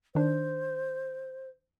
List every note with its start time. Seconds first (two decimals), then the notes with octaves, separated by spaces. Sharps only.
0.15 D#3 D4 C5